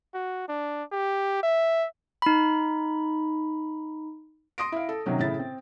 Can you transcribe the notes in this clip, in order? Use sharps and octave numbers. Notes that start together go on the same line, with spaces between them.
F#4
D4
G4
E5
D#4 B5
C6 D#6 A#6 D7
E4 F5
A4
C3 D#3 F#3 C#4
A2 C#3 E4 A6
C4